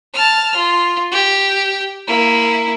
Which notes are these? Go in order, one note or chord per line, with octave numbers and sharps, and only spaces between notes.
A5 F6
F4
G4
A#3 E4